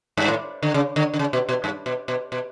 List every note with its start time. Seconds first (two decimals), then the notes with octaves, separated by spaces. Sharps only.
0.17 G2
0.28 A2
0.63 D3
0.74 C#3
0.96 D3
1.14 D3
1.19 C#3
1.33 B2
1.49 B2
1.64 G2
1.86 B2
2.08 B2
2.32 B2